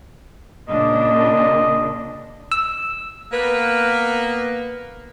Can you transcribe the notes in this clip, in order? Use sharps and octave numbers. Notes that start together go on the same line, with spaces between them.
A#2 C#3 D4 D#5
E6
A#3 B3 B4